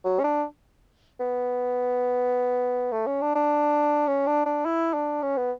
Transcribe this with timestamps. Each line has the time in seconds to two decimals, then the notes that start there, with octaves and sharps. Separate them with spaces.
0.05 F#3
0.20 C#4
0.24 D4
1.20 B3
2.92 A3
3.07 C#4
3.21 D4
3.35 D4
4.07 C#4
4.27 D4
4.46 D4
4.65 E4
4.94 D4
5.22 C#4
5.37 B3